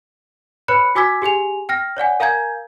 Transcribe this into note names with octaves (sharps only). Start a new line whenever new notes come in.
B4 C#5 B5 F#6 C#7
F#4 G#5 D6 E6 G#6 B6
G4 G#4 G#5 F7
G5 F6 A#6
C#5 D5 F#5 G#5
A#4 F5 G#5 A#5 G6 G#6